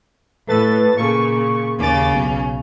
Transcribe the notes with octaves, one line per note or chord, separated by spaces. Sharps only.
A2 A4 B4 A6
A#2 C#3 C#6
D#2 C#3 C#4 D6 A6
B1